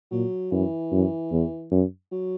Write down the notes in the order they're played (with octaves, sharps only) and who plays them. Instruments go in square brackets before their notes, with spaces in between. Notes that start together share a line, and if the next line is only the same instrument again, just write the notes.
[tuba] A#2 [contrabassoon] F#3
[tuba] F#2 [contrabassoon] E3
[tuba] F#2
E2
F#2
[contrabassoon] F#3